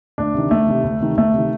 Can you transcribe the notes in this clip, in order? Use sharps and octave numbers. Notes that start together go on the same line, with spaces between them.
D2 D4
C3 D#3
D2 A3
C3 D#3
D2
C3 D#3
D2 A3
C3
D#3